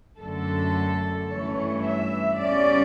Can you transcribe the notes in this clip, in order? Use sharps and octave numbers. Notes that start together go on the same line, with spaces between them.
F#2 D3 A3 A4
G2 E3 A3 C#4 C#5
E5
E2 C#3 G3 C#4 D5